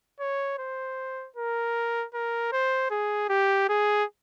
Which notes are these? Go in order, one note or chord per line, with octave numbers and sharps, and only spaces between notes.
C#5
C5
A#4
A#4
C5
G#4
G4
G#4